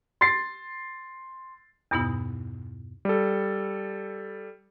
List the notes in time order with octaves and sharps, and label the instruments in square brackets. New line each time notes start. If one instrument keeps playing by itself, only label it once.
[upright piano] C6 A6 C7
[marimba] E2 G2 B2 B3 D#4 E4
[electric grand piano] G3 A4